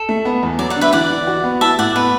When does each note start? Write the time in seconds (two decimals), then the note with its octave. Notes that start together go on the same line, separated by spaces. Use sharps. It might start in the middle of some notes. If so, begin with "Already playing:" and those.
Already playing: A4
0.09 A3
0.25 B3
0.43 E2
0.59 F#3 D5
0.70 D5 F#5
0.76 D3
0.81 B4 E5
0.93 E3 D5 F#5
1.10 E3
1.27 F#4
1.44 B3
1.61 E4 E5 A5
1.78 A2 D5 F#5
1.95 B3 B4